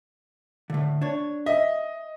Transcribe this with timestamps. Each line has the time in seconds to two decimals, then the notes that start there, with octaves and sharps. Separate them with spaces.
0.70 A2 D3
1.01 D4 C#5
1.46 D#5 E5